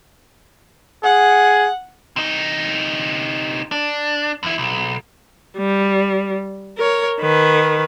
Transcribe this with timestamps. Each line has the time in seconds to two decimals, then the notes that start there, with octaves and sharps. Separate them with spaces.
1.04 G#4 F#5
2.16 C3 D#4
3.72 D4
4.43 E2 E4
4.58 B1
5.57 G3
6.77 A#4 C#5
7.20 D#3 B4